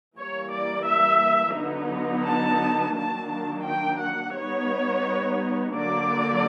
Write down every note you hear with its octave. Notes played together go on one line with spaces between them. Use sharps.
E3 G3 A#3 C#5
D5
E5
D3 F#3 B3 D#4
A5
D#3 F#3 A#3 D4 A5
A5
G5
F#5
G3 B3 D#4 C#5
D3 F#3 A#3 D4 D5